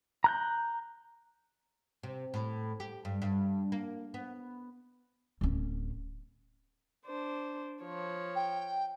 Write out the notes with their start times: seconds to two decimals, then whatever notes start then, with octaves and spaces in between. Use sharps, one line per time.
0.24 A#5 F#6 G6
2.03 C3
2.34 A2
2.80 G4
3.05 G2
3.22 G2
3.72 A#3
4.14 B3
5.41 D1 C#4
7.06 D4 C5
7.83 F3 C#5
8.35 G5